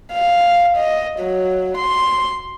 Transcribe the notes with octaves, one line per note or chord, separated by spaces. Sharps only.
F5
D#5
F#3
C6